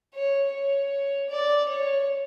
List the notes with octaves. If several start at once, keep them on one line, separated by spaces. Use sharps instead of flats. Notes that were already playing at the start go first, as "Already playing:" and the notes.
C#5
C#5
D5
C#5